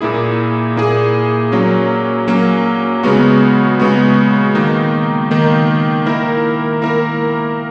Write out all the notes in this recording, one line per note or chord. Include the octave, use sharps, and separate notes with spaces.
A#2 A#3 E4 G#4
A#2 A#3 E4 G#4
F#3 A#3 C#4
F#3 A#3 C#4
C#3 G#3 B3 F#4
C#3 G#3 B3 F#4
D#3 A#3 D#4
D#3 A#3 D#4
A#3 E4 A#4
A#3 E4 A#4